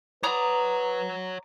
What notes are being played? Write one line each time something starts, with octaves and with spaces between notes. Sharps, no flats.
B4 C#5 D5 F#5 A#5 D#6